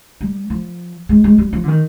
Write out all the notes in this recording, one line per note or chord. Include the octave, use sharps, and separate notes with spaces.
G3
F3
G#3
G#3
G3
F3
D3
D#3